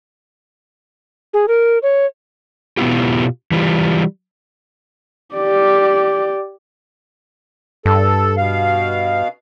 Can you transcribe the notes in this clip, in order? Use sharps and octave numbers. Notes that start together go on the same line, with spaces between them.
G#4
A#4
C#5
B2 B3 C4 E4 F4 G4
E3 G3 F4
G4 D5
G2 A4
B2 F5